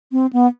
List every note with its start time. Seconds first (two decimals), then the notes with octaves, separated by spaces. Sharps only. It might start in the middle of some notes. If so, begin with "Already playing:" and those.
0.12 C4
0.33 B3